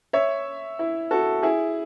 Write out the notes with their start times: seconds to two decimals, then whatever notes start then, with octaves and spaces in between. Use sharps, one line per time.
0.13 C#5 E5
0.79 E4
1.11 F#4 A4
1.43 E4 G#4